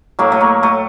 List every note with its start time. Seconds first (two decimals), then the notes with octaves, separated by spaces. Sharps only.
0.19 A2 F#3 A3 A#3
0.32 A3
0.41 A#3
0.63 A3